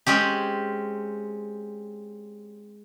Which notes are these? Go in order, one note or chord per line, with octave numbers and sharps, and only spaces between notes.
G#3 C4 C#4 G4